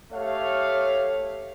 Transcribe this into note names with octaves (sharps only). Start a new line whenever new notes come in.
A3 G4 C#5 F5